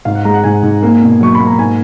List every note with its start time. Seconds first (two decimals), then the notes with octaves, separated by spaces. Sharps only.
0.05 G#2 F5
0.15 F#5
0.25 G#3 A#5
0.34 F#5
0.44 G#2 G#5
0.63 G#2
0.82 A#3
1.02 B2
1.21 F#3 C#6
1.35 A#3 B5
1.46 A#5
1.59 G#2 G#5